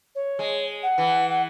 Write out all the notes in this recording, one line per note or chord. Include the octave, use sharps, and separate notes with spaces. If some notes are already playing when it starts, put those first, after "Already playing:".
C#5
G#3
F#5
E3
F#5